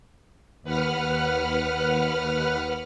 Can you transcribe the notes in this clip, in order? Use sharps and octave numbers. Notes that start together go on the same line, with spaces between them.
D#2 B4 F#5 F6